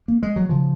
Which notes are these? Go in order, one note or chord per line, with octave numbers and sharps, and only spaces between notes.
A#3
G#3
F#3
C#3 F3